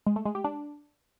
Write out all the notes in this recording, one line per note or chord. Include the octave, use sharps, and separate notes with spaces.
G#3
A3
G#3
G4
D4